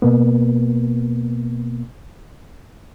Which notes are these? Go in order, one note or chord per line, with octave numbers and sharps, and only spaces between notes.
B2 A#3 B3